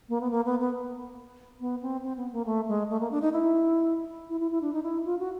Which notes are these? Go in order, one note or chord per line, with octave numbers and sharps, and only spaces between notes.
A#3
B3
A#3
B3
B3
B3
C4
C4
B3
A#3
A3
G#3
A3
A#3
D4
D#4
E4
E4
E4
E4
D4
D#4
E4
F4
F#4